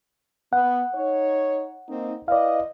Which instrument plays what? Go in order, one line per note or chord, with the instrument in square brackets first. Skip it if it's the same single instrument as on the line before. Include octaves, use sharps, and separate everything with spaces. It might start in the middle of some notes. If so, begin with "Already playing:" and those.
[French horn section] B3 [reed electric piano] F#5
[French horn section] D#4 C#5
A#3 C4 D#4
[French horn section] E4 B4 D#5 [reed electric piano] D5 F5